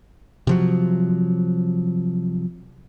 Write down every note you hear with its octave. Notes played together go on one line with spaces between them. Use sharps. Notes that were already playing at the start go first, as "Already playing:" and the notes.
C3 F3 F#3